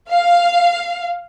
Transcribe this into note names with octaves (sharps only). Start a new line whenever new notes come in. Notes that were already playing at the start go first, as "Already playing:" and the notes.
F5